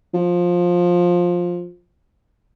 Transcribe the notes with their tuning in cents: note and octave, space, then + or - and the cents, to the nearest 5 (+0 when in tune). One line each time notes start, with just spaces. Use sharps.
F3 +15